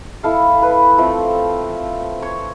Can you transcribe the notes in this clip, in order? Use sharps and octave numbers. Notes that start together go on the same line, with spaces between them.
E4 A4 F5
B4
F3 A3 C4
C#5